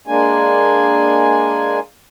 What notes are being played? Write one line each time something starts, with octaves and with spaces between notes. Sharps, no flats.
G#3 A#3 D4 G#5